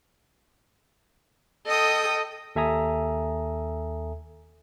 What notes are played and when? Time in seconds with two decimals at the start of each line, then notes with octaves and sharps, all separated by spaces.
1.66 A4 D#5 G5 D#6
2.56 D#2 A4 E5 G#5 A#5 D#6